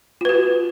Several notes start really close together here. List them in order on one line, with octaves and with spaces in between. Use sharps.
F4 B4 F#4